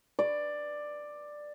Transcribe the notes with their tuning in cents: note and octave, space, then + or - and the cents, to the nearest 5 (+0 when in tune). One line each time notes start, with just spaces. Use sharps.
D5 +10